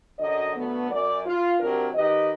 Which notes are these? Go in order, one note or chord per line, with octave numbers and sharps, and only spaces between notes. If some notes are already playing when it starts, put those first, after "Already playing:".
F#2 D3 F#3 D#5
D3 F#3 A3 B3
F#2 D5
F4
C3 F#3 D4 G4 A#4
D#3 G4 B4 D#5